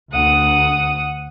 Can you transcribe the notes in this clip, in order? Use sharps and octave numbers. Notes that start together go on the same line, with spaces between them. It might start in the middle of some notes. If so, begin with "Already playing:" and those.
D2 F#5 D#6